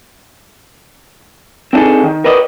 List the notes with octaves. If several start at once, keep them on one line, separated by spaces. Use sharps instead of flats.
C4 D4 D#4 G#4 A4
D#3
A#4 B4 D5 D#5